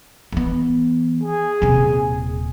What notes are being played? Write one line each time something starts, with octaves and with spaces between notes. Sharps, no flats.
E3 B3
G#4
D#1 C3